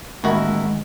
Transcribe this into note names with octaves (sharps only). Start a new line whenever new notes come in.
A1 D#3 G#3 A#3 E4 F#4